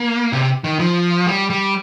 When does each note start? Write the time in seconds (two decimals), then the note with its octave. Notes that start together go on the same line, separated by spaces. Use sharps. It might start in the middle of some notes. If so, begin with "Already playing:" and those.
Already playing: A#3
0.32 C3
0.64 D#3
0.80 F3
1.27 G3
1.50 G3